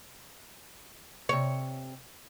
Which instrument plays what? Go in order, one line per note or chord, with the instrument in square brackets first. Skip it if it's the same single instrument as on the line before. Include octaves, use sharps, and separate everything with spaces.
[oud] C3 C#5